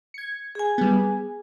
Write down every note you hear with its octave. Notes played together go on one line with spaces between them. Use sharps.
G#6 C#7
G#4 G#5
G3 B3